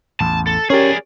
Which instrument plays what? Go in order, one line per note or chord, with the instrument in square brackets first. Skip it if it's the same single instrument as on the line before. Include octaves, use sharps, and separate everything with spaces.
[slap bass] A1 E2 [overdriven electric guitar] A5
[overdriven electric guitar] A4
[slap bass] C#4 [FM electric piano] G4 A#4 C#5 [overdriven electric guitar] G#4 D5